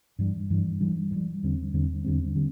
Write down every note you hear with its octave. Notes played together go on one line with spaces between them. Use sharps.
G2 E3 G3
G2 E3 G3
G2 E3 G3
G2
E3 G3
E2 D3 G3 C4
E2 D3 G3 C4
E2 D3 G3 C4
D3 G3 C4